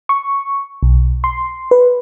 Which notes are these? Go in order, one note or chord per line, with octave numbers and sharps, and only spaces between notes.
C#6
B1
C6
B4